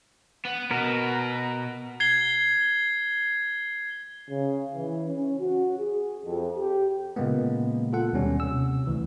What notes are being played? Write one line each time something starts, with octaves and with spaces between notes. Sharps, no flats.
B3
B2 B3 A#4
G#6 C7 G7
C#3
E3
C#4
F#4
G#4
F2
G4
A#2 C#3 G#3 A#3 B3
F4 A4 F#5
D#2 B2 G3 C#4
C3 E6
D2 E3